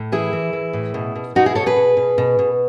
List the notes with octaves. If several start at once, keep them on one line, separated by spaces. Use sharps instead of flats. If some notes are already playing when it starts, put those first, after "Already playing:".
Already playing: A2
E3 E4 G#4
E3
E3
A2
B2
B2
B2 D#4 F#4
E4 G#4
B2 A4 C#5
G#4 B4
B2
B2
B2
B2